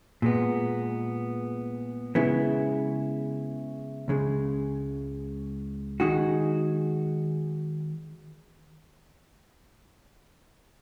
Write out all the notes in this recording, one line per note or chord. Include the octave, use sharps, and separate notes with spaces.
A#2 G#3 B3
C#3 G#3 B3 E4
C#2 C#3 G#3
D#3 G#3 D#4 F#4